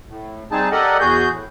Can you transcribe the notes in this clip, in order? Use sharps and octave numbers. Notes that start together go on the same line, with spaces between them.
A2
G3 C4 D#4 G#4 A5
G4 A4 A#4 D5 D#5 F#5
E2 F#4 G#4 G6
A2